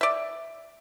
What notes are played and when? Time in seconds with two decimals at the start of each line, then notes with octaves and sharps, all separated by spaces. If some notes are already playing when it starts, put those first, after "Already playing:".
0.01 D5 E5